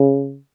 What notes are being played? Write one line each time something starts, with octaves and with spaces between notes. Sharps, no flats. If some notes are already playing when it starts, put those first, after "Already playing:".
Already playing: C#3